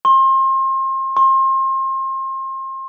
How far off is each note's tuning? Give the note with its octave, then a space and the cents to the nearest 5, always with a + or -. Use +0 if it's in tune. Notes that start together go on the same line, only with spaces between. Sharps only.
C6 +35
C6 +35